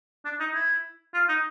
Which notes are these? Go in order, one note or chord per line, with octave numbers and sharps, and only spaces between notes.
D4
D#4
E4
F4
D#4